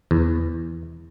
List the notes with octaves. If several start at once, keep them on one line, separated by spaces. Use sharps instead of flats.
E2